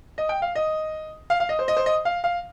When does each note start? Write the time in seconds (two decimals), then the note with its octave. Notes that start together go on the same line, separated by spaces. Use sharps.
0.18 D#5
0.29 G5
0.42 F5
0.55 D#5
1.30 F5
1.40 F5
1.49 D#5
1.59 C5
1.68 D#5
1.77 C5
1.86 D#5
2.05 F5
2.24 F5